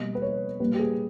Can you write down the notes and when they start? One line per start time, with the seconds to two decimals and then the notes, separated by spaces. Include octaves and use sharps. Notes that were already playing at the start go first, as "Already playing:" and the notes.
Already playing: B2 G3 A#3 D#5
0.15 B4
0.22 C#5
0.60 A#2 G3 A#3 B4
0.74 G4
0.79 G#4